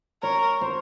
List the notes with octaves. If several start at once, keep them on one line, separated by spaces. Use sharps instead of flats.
A#4 C#5
C5